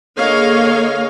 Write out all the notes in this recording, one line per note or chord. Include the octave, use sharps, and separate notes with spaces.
D3 A#3 G#4 C#5 D#5 F5